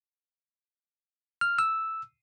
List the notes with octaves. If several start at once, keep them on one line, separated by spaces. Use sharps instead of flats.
F6
E6